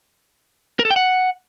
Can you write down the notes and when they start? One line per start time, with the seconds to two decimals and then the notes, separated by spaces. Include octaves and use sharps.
0.79 A#4
0.85 A4
0.91 G5
0.96 F#5